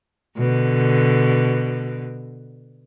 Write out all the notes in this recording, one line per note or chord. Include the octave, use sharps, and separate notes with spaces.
B2 D3